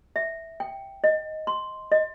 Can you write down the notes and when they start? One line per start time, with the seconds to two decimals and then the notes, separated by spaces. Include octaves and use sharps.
0.16 E5
0.60 G5
1.04 D#5
1.47 C6
1.92 D#5